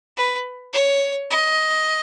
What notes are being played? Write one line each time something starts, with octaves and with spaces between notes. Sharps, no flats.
B4
C#5
D#5